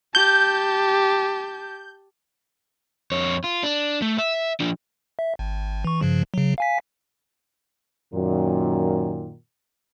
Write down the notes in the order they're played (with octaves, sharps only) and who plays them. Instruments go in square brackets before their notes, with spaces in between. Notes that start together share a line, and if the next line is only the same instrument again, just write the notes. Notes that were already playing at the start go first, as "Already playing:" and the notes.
[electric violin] G4 A5 [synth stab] G6
[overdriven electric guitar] F2 C#5
F4
D4
A3
E5
F3 D4
[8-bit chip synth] E5
G#1
E3 C#6
G2 C#3 F3
C#3 F#3
F5 G#5 B6
[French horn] F#2 [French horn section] A#2 D#3